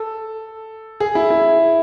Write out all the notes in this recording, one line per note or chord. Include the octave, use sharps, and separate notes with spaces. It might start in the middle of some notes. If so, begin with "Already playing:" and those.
Already playing: A4
G#4
E4
E4